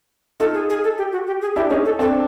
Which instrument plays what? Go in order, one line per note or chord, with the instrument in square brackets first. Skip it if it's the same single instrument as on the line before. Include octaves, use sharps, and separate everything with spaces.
[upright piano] D#4 F4 [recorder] A4
[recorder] G#4
G#4
A4
G4
F#4
G4
G#4
[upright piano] D4 E4 [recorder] G4
[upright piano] C#4 D#4 [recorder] G#4
[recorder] A4
[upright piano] C4 D4 [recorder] A4